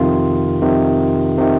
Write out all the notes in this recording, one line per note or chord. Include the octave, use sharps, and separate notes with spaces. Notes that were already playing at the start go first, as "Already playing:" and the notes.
Already playing: F2 C3 D#3 F4
F2 C3 D#3
C3 D#3